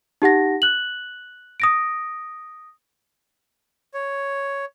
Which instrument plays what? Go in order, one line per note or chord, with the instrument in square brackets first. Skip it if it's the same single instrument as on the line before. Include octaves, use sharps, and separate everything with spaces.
[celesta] D#4 G4 F#5 A#6
F#6 F#7
D#6 A#6 D7
[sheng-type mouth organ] C#5